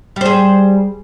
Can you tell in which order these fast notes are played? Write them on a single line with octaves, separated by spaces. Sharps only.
G3 C5 G#4